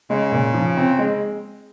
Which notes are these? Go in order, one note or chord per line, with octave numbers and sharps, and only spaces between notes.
C#3 G#3
A#2
F3
C4
G#3